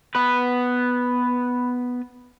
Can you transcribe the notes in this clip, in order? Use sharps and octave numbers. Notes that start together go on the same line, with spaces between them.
B3 B4